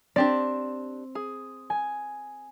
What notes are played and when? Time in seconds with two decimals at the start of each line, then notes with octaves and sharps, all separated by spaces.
0.16 C4 D4 G4 D5
1.15 G#4
1.70 G#5